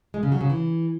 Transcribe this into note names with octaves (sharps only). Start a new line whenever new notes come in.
G#3
C#3
F#3
C#3
E3